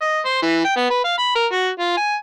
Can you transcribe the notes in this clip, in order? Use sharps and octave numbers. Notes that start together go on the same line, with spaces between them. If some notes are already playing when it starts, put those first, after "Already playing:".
D#5
C5
E3
G5
B3
B4
F5
B5
A#4
F#4
F4
G#5